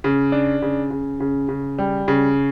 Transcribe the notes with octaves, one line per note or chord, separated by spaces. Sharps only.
C#3
D4
C#3
C#3
C#3
C#3
G3
C#3